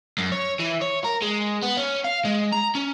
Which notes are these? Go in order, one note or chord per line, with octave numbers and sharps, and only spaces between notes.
F#2
C#5
E3
C#5
A#4
G#3
B3
C#4
F5
G#3
A#5
C#4